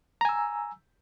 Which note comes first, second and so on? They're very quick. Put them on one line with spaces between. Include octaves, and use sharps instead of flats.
A#5 G#5 E6